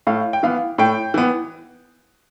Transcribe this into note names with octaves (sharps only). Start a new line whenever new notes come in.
A2 F5
G5
E3 B3 F5
A2 G5
E3 B3